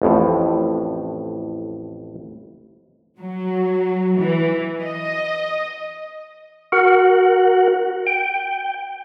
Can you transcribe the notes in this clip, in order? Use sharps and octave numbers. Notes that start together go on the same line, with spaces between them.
A1 F2 A2
F#3
E3
D#5
F#4 A#4 F#5
G5